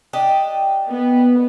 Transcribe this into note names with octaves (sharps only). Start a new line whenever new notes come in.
D4 G4 D#5
B3